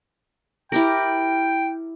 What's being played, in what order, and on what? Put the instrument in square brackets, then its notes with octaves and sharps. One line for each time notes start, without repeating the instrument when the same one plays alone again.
[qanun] E4 G4 A#4 [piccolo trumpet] G5